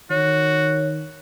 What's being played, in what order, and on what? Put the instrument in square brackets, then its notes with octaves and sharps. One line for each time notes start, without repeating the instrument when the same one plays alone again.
[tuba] D#3 [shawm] F#4 [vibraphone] C#5